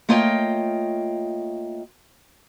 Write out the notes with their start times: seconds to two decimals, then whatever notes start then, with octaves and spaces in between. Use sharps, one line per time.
0.09 A3 A#3 F4 C#5 D#5 G5